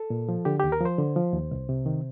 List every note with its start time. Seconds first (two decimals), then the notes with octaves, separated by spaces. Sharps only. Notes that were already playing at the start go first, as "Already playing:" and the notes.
Already playing: A4
0.10 A#2
0.29 F3
0.45 D3 G4
0.60 D#2 G4
0.72 A#4
0.81 F3 C5
0.98 D3
1.16 F3
1.33 D#2
1.51 C2
1.69 C3
1.86 D#3